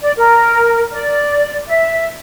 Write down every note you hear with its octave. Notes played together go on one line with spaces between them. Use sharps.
D5
A#4
D5
E5